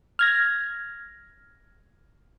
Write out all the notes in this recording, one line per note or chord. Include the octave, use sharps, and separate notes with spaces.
F6 G#6 A#6